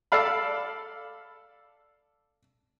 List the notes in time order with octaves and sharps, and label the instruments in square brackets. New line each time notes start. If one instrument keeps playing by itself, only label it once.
[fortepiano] A4 D5 F5 B5